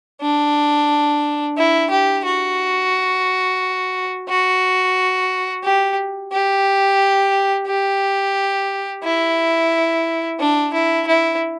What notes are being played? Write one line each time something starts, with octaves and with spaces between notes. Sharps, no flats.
D4
E4
G4
F#4
F#4
G4
G4
G4
E4
D4
E4
E4